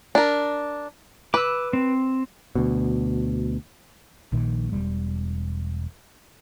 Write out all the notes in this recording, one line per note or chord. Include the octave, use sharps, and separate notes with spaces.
D4 A#4
B4 D6 E6
C4
D2 B2
A#1 A#2 D#3
E1 G3